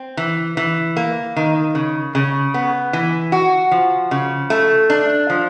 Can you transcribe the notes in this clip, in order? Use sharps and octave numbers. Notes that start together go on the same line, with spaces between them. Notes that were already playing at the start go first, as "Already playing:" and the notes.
Already playing: C4
E3
E3
A#3
D#3
C#3
C#3
B3
E3
F#4
F3
C#3
A3
D4
F3